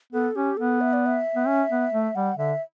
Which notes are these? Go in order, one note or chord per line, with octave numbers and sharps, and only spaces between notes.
B3 A4
C#4 G4
B3 A4
E5
D5
E5
B3
C#4
B3
A3
G3 F#5
D3 E5